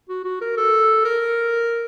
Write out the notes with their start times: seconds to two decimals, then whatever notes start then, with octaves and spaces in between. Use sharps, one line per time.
0.09 F#4
0.25 F#4
0.41 A#4
0.57 A4
1.05 A#4